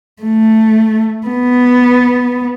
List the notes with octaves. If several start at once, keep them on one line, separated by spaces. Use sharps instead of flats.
A3
B3